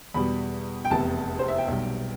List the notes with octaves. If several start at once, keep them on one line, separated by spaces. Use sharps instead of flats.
E2 B2 G3 B5
G5
F1 E2 C3 A5
C5
E5
G5
B1 B2 G3